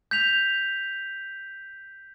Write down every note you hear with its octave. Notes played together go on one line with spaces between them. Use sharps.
G6 B6 F7